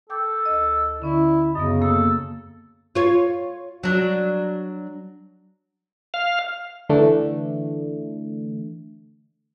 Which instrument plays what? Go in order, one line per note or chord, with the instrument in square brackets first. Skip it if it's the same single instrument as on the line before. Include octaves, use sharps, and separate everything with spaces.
[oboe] A4 [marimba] G5 D6 G6
[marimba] D2 D#5
[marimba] D3 C#4 D5 [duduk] E4
[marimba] F#2 B3 [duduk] C#3 [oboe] D#5
[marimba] A#3 [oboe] A4
[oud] F4 C#5
F#3 D4
[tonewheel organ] F5
[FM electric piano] D3 E3 A3 D4